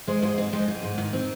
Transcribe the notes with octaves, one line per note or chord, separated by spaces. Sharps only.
G#3 C5 D#5
G#2 C5 D#5
C4
G#3 D#5 G5
G#2
G#2
D#3
C4